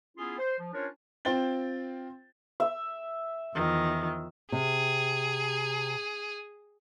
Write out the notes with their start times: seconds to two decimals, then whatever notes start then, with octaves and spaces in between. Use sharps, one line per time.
0.17 B3 C#4 E4 F4 G#4
0.39 C5
0.59 F3
0.73 C#4 D4 F4 A#4 C5 C#5
1.25 C4 F4 C5 G5 A6 G7
2.60 E5
3.53 E2 D#3 F3
4.52 C3 G#4